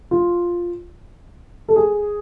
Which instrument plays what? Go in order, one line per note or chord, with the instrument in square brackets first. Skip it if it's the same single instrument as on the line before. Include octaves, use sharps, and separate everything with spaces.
[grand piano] F4
A4
G#4